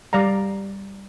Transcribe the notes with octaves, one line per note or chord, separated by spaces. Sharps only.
G3 D5 F5 A#5